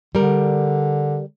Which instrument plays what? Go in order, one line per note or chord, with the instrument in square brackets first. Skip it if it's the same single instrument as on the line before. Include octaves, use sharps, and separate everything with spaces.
[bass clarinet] D3 [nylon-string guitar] G3 A#4